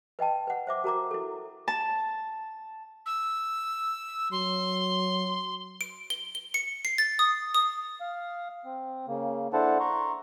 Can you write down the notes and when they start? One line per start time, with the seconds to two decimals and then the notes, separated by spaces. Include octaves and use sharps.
0.19 B4 D#5 G5 A5
0.47 B4 F#5
0.67 C5 E5 D6
0.84 F#4 A#4 A#5 D6
1.11 E4 A4
1.68 A5
3.06 E6
4.32 F#3 C6
5.81 D7
6.10 G7
6.35 G7
6.54 C#7
6.85 C7
6.98 A6
7.19 D#6
7.55 D#6
8.01 F5
8.65 C4
9.08 C#3 A#3
9.53 D4 E4 A4 C5 F#5 A5
9.80 A#5 C6 C#6